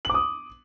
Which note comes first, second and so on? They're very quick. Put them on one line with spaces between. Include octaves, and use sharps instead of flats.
F#7 D6 D#6